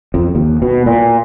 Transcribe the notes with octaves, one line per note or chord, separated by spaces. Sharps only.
F2
D#2
B2
A#2